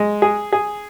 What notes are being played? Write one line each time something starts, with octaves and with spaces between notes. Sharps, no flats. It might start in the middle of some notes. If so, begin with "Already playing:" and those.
Already playing: G#3
G#4
G#4